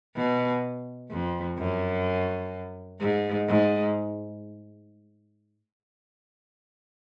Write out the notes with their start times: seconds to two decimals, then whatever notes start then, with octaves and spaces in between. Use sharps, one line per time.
0.16 B2
1.10 F2
1.58 F#2
3.00 G#2
3.48 G#2